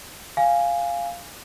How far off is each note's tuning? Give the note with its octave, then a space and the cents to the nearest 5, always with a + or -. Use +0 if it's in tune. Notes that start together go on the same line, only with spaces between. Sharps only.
F5 -5 G#5 -5